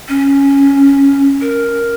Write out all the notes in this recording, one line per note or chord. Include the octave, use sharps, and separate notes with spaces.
C#4
A#4